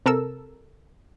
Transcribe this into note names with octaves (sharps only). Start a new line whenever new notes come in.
C3 A4 A#4 E6